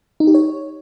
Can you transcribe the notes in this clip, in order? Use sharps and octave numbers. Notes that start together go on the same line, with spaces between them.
D#4
G4
C#5